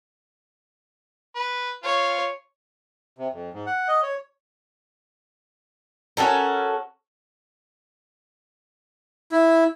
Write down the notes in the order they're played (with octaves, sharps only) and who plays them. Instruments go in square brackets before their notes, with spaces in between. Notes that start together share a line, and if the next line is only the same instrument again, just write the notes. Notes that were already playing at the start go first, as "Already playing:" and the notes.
[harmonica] B4
[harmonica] F4 [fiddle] C#5
[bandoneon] C3
F2
G#2
F#5
D#5
C#5
[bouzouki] C#4 F#4 A4 A#4
[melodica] E4